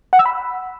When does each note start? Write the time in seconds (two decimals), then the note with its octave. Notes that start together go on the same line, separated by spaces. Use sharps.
0.13 F#5
0.19 E6
0.26 B5